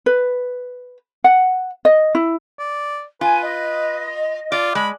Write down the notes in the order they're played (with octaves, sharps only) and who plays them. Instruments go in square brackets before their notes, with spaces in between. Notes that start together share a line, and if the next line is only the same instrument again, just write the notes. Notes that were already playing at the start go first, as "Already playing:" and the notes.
[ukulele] B4
F#5
D#5
E4
[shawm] D5
[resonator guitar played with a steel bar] F4 [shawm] B4 [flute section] G#5
[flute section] D#5
[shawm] F4 [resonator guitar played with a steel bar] D5
[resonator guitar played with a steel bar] G#3 [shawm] B5